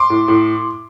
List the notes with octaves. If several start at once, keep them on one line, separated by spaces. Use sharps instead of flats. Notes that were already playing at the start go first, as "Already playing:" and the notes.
Already playing: C6 D6
A2
A2